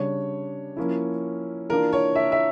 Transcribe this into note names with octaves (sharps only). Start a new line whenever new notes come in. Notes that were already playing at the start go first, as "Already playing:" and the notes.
Already playing: C#3 G3 D4 C#5
F3 A#3 C#4 E4
E3 A#3 D4 F4 A#4
C#5
E5
E5